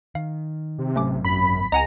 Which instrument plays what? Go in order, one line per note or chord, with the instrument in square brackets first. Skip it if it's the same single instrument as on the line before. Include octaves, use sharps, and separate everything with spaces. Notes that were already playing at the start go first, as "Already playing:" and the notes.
[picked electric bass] D#3 [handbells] F5
[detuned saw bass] C3
[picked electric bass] G#1 F#3 C4 [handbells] A3 C#4 D6
[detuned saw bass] F#2 [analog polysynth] B5
[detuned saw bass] C#2 [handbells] D#5 F#5 G#5 [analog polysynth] A#5